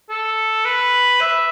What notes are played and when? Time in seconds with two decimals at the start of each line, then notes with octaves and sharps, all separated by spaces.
0.10 A4
0.65 B4
1.21 E5